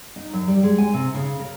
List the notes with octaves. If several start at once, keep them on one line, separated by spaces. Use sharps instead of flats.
D#4
F#2
G3
G#3
G#5
C3
C#3
A#4